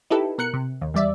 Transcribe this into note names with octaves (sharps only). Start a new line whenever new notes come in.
D#4 E4 G4 A4 B4
B2 A#4 F#6 C#7
C3
D#2
E2 G3 D5 E5